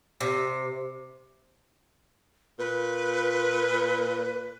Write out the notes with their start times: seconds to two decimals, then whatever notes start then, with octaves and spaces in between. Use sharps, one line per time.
0.20 C3
2.59 A#2 B4